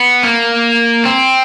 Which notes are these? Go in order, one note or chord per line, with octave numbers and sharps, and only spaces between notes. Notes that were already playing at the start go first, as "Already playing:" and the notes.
Already playing: B3
A#3
C4